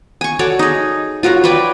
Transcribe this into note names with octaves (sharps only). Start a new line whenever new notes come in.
G#5 C#6
F#4 A4 C#5 D5
D#4 G#4
F4 F#4 A#4 C#5
B4 C#5 D5 G5